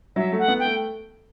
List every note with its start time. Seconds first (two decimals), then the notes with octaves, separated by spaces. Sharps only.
0.16 F#3 E5
0.32 A3
0.38 F#5
0.48 B3
0.59 G5
0.65 A3